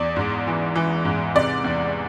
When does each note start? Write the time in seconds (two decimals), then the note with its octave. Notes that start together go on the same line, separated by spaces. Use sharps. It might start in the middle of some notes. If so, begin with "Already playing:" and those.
Already playing: E2 D5
0.16 G#2
0.47 E3
0.75 E3
1.05 G#2
1.35 C3 D5
1.64 E2